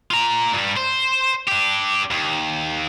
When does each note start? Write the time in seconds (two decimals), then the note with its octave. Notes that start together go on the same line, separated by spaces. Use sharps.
0.11 F4 A#5
0.54 G2 G3
0.77 C5
1.47 D4 G4
2.11 D#2